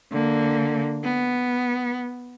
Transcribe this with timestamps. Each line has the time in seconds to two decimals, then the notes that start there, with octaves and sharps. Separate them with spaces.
0.12 D3 A#3
1.04 B3